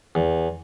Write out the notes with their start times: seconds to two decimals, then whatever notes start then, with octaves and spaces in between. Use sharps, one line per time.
0.15 E2